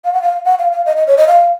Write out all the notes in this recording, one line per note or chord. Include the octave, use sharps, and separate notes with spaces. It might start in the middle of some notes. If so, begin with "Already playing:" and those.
F5
F#5
F5
F#5
F5
F5
D#5
D#5
C#5
D#5
F5